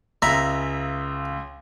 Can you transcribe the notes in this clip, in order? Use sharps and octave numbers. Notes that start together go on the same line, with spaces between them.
C#2 C#3 E5 A#5 B5